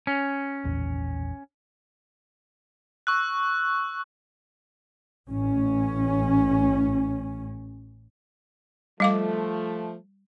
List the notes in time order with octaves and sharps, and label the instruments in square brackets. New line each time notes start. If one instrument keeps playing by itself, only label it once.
[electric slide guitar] C#4
[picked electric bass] E1 A#1 E2
[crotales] C#6 E6 F#6
[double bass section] A1 C#4
[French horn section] F3 A3 [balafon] G3 F5 D6